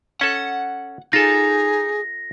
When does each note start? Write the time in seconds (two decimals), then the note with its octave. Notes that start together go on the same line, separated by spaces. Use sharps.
0.21 C#4 A4 F#5
1.13 D#4 F4 G#4 A4 A#6